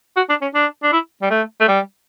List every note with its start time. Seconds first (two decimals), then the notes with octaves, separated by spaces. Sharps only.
0.16 F#4
0.29 D4
0.42 C#4
0.54 D4
0.83 D4
0.92 E4
1.22 G3
1.30 A3
1.60 A3
1.68 G3